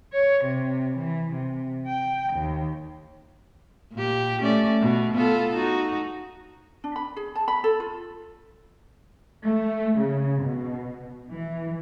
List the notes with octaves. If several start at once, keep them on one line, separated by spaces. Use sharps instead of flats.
C#5
C3
E3
C3
G5
D#2
A#2 G4
A3 C#4 D5
B2
B3 F4 A4
D#4 F#4
D4
B5
G#4
A5
B5
A4
F4
A3
C#3
B2
E3